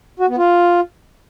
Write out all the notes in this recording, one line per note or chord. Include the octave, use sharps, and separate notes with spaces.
F#4
B3
F4